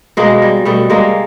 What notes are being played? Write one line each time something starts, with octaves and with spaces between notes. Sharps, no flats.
B2 G#3 A#3
G3
B2 G3 A3
G3 G#3 A#3